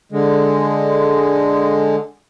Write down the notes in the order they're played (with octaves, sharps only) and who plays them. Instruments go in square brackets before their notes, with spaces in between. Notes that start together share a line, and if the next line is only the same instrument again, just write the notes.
[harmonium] D3 G#3